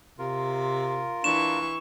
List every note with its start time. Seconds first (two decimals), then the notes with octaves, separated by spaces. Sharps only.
0.19 C3 F4 A#4
1.24 E3 D4 C#6 E7